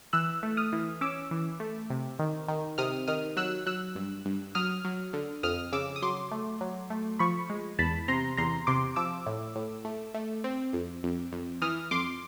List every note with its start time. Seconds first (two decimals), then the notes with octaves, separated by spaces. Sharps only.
0.13 E3 E6 F#6
0.43 A3
0.57 D#6 F6
0.73 E3
1.01 C#4 D6 E6
1.31 E3
1.60 A3
1.90 C3
2.19 D#3
2.48 D#3
2.78 C3 D#6 F6
3.07 D#3 D#6 F6
3.37 F#3 E6 F#6
3.66 F#3 E6 F#6
3.95 G2
4.25 G2
4.55 F#3 D#6 F6
4.85 F#3
5.13 D3
5.43 F2 D#6 F6
5.73 C#3 D6 E6
5.96 D#6
6.02 F#3 C6 D6
6.31 A3
6.61 F#3
6.90 A3
7.19 F3 B5 C#6
7.50 G#3
7.79 E2 A5 B5
8.08 C3 A#5 C6
8.37 E2 A#5 C6
8.67 C3 C6 D6
8.96 F3 D6 E6
9.27 A2
9.56 A2
9.85 A3
10.14 A3
10.44 C4
10.73 F2
11.03 F2
11.32 F2
11.62 E3 D#6 F6
11.91 F2 C6 D6